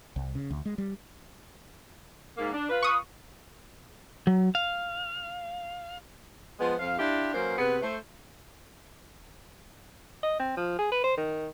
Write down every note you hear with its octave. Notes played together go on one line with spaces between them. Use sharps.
C2
C#3
D2
G#3
G3
G#2 A#3
D4
F4 B4
C#6 D#6
F#3
F5
F3 G#3 B3
F2 F3 F5
D4 E4 F4 G4
F#3 A#3 C#4 B4 C5
C3 B3 G#4 B4
A3 C5
D#5
C4
F3
G#4
B4
C5
D#3